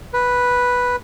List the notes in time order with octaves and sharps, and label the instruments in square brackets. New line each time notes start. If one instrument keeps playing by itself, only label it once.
[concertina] B4